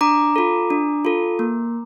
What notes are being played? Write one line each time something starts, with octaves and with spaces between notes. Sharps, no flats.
D4 A#5 D6
F4 A4
D4
F4 A4
A#3